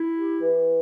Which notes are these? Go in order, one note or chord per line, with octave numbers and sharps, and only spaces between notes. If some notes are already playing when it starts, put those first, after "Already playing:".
Already playing: E4
G4
E3